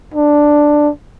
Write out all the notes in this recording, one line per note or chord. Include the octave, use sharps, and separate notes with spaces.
D4